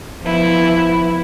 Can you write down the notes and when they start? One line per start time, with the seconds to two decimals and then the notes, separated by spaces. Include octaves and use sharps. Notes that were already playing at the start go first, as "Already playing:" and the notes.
0.21 F3 B3 E4